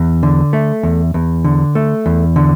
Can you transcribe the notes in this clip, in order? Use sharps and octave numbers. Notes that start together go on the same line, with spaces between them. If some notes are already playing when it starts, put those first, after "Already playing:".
Already playing: E2
D3
A3
E2
E2
D3
A3
E2
D3